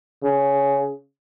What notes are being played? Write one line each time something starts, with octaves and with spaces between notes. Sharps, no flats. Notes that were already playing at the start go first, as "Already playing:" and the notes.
C#3